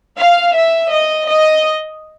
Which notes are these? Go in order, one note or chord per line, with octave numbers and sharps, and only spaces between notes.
F5
E5
D#5
D#5